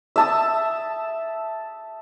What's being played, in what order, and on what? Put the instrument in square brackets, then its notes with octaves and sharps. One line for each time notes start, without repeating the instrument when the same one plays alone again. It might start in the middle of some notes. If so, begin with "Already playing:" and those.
[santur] E5 A5 D#6